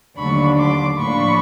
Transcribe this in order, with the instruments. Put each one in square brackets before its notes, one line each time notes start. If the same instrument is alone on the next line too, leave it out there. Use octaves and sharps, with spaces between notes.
[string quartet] D#2 D3 F#3 A3 D4 B5 C#6
C6 D6
A2 F3 A#3 D4 B5 C#6